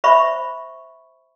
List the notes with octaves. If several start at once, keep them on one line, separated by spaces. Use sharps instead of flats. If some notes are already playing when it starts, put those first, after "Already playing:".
C5 E5 B5 C#6